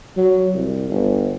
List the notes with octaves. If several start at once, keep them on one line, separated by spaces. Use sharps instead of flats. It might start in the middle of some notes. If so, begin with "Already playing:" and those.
F#3
C2
G1